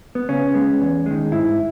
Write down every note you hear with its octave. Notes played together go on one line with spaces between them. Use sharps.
B3
C#3 C#4
G#3 B3
E2
D#3 G#3
G#2 E4